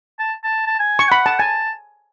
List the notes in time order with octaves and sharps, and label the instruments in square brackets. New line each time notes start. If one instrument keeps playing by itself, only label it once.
[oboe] A5
A5
A5
G#5
[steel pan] C#6
[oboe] F#5 [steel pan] B5
[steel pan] A5
[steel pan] G#5 [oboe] A5